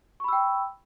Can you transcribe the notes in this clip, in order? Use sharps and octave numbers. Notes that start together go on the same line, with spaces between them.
G5 B5 C#6 E6